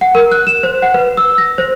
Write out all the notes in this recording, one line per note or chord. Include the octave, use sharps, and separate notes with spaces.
F#5
A#4
F#6
E7
C5
F#5
B4
E6
A#6
C5